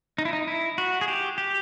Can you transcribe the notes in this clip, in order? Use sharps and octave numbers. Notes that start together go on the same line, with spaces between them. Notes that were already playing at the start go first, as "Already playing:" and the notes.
D#4
E4
D#4
E4
F#4
G#4
G4
G4